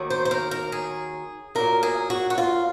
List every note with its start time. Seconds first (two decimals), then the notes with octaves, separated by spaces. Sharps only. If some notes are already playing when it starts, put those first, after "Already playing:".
Already playing: D#2 D#3 F#3
0.10 C5
0.25 C5
0.31 A#4
0.51 A#4
0.72 G#4
1.55 A#2 F#3 A#4
1.83 G#4
2.10 F#4
2.30 F#4
2.38 F4